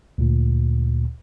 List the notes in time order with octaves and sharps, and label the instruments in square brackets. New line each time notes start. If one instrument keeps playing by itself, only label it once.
[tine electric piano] D2 A#2